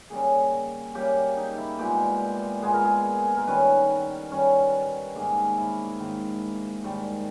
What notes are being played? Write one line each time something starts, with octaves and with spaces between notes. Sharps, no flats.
C#3 G3 A#3 G#4
C#3 G3 A#3 G4
D#4
E4
A#2 G#3 B3 G4
A#2 G#3 B3 G#4
A#4
G#4
A#4
D#3 G3 C#4 B4
D#3 G3 C#4
G#2 D#3 A#3 G#4
E4
G#2 D#3 A#3
G#2 D#3 G3